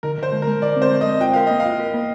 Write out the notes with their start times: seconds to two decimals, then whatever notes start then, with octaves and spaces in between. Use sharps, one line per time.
0.03 D3 A#4
0.18 D3 C5
0.32 G#3
0.42 A#4
0.47 G#3
0.62 D3 D5
0.76 C4
0.82 C5
0.92 G#3
1.01 D#5
1.06 G#3
1.21 F4 G5
1.33 A#4 F5
1.47 A#3 D#5
1.60 F5
1.65 F4
1.80 A#4
1.94 A#3